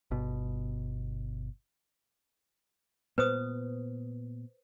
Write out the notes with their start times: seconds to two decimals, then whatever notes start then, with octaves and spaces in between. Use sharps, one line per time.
0.11 G1 B2
3.18 A#2 B3 B4 C5 D#6